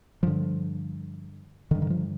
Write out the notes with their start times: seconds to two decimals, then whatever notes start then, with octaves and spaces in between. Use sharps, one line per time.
0.23 G2 D3 F3
1.71 G2 D3 D#3
1.82 D#3
1.90 F3